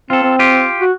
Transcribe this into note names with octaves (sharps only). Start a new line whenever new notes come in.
C4 F4 A4
C4
F4 G4
F#4